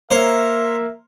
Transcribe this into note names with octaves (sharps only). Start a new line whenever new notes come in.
A#3 A#4 C5 C#5 E5